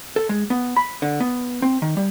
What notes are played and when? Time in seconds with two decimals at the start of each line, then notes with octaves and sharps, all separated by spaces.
0.16 A4
0.29 G#3
0.50 B3
0.76 B5
1.02 D3
1.20 B3
1.62 C4
1.82 D#3
1.97 G3